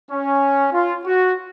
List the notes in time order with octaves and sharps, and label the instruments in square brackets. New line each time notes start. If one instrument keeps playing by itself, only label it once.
[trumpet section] C#4
F4
F#4